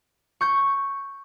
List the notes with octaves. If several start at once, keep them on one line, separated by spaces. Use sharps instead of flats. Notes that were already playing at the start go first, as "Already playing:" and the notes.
C#6 G6